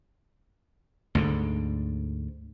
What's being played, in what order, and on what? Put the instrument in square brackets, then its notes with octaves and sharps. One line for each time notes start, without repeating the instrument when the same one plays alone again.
[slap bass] D2 G#2 D3